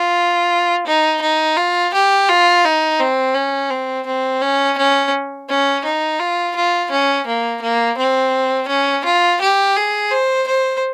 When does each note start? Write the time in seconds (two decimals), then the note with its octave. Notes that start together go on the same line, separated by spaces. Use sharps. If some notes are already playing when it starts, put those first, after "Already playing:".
Already playing: F4
0.87 D#4
1.21 D#4
1.57 F4
1.94 G4
2.29 F4
2.65 D#4
3.00 C4
3.35 C#4
3.70 C4
4.06 C4
4.42 C#4
4.78 C#4
5.49 C#4
5.84 D#4
6.19 F4
6.55 F4
6.91 C#4
7.27 A#3
7.62 A#3
7.98 C4
8.68 C#4
9.05 F4
9.41 G4
9.76 G#4
10.11 C5
10.48 C5